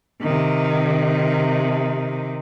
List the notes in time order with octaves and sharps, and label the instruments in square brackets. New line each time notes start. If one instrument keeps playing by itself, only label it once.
[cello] C3 D#3